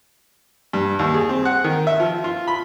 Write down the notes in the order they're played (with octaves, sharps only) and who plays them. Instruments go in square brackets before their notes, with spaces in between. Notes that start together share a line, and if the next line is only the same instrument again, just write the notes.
[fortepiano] G2
D#2
G#4
C4
F#5
D#3
E5
F3
F4
B5